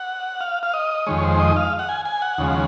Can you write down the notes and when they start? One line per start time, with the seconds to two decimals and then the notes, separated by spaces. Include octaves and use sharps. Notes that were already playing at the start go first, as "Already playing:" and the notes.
Already playing: F#5
0.41 F5
0.63 F5
0.74 D#5
1.06 F2 D#3 G#3 C#5
1.23 C5
1.39 D#5
1.56 F5
1.79 F#5
1.89 G#5
2.05 G#5
2.22 F#5
2.38 D#2 C#3 F3 G#3